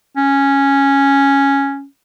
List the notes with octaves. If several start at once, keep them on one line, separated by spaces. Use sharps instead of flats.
C#4